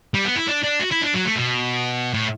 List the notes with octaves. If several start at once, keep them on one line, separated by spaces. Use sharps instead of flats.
G3
B3
E4
D4
D4
F#4
E4
D4
F#3
A3
B2
A2